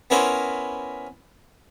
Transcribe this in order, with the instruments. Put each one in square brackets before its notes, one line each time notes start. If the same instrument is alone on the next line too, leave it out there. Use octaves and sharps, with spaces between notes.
[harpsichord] B3 C#4 E4 A#4 C5